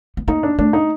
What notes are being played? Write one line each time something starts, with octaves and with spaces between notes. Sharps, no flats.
B3
A#3 D#4
D4
A3 D4
D#4